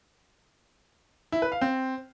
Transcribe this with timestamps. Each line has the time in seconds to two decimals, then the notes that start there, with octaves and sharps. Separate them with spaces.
1.32 E4
1.42 B4
1.52 F5
1.61 C4